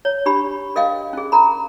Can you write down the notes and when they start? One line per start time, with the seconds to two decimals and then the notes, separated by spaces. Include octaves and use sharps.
0.05 C#5
0.26 D4 G4 B5
0.76 A#4 D#5 F5 G5
1.13 C#4 G#4
1.32 A#4 A#5 B5